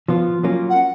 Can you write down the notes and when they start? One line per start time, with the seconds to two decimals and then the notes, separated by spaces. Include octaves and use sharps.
0.08 F3 B3 F4
0.43 F#3 A#3 C#4 F4
0.70 F#5